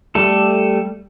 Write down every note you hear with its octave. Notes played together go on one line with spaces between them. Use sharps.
G3 A3 A4